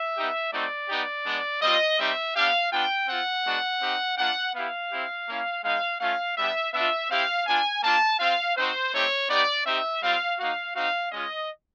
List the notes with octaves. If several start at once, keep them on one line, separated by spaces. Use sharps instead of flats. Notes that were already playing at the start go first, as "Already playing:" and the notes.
Already playing: E5
B3 D#4 G4
A3 C4 D#4 F#4 D5
B3 D#4 G4
G#3 B3 D4
G3 C4 F4 D#5
G3 C4 D#4 G4 E5
B3 D4 G4 F5
B3 D4 F4 G5
C4 F4 F#5
G#3 B3 D4 F#4
C4 D#4 G4
A#3 D4 F4 F#5
B3 E4 G4 F5
C4 E4 G4
A#3 C#4 E4
G#3 B3 D#4 F5
A3 C#4 F4 F5
G3 B3 D4 G4 E5
B3 D4 F4 E5
C4 E4 G4 F5
B3 D4 F4 G#5
A#3 D4 F4 A5
C4 F4 F5
C4 D#4 F#4 C5
A3 C4 D#4 G4 C#5
B3 D#4 G4 D5
C4 D#4 G4 E5
G3 C4 F4 F5
A#3 D#4 F#4 F5
C4 D#4 F#4 F5
G#3 C#4 F4 D#5